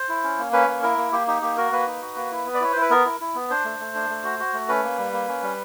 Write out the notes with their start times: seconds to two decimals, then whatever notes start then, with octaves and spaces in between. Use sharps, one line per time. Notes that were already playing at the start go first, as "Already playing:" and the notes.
Already playing: C5
0.09 E4
0.23 C#4
0.38 A#3
0.53 C#4 B4
0.68 A#3
0.83 E4 A#4
0.98 A#3
1.12 A#3 G4
1.27 D#4 G4
1.42 A#3 G4
1.57 F#4 A#4
1.72 A#3 B4
1.87 D#4
2.02 F#4
2.16 A#3
2.31 E4
2.46 B3
2.54 D5
2.61 E4 C#5
2.72 E4 C5
2.81 B4
2.90 B3 A#4
3.05 E4
3.20 E4
3.35 B3
3.50 D4 C5
3.65 A3
3.80 A3
3.95 D4
4.10 A3
4.24 F#4
4.39 F#4
4.53 A3
4.69 C#4 B4
4.83 A#3
4.98 G3
5.13 A#3
5.28 C#4
5.43 G3